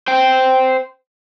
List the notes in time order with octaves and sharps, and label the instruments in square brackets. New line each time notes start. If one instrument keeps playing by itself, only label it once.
[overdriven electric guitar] C5 G5